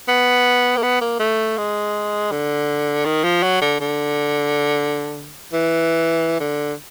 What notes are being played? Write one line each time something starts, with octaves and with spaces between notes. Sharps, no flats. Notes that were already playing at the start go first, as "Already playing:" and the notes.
B3
A#3
B3
A#3
A3
G#3
D3
D#3
F3
F#3
D3
D3
E3
D3